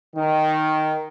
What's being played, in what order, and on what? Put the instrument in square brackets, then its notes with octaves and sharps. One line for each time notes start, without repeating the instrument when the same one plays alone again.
[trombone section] D#3